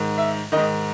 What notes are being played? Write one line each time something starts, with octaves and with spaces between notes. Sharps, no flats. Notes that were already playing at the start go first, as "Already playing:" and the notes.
Already playing: G#2 D#3
E5
G#2 D#3 D#5